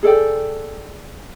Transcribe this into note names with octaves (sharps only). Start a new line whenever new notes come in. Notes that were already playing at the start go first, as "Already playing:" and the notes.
G#4 A4 D5 G5